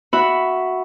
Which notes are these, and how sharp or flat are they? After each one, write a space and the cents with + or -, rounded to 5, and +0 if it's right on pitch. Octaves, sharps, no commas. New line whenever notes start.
F#4 +0 E5 +0 B5 +0